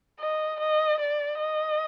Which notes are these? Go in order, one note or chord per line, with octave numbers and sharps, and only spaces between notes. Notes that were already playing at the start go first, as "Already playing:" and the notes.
D#5
D#5
D5
D#5